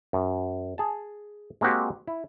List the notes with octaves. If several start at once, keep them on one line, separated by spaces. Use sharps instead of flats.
F#2
G#4 A5
G#3 A#3 C4 F#4 G4
E4